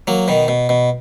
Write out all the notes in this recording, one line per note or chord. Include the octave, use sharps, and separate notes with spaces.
F#3 A#3
B2 D#3
B2
B2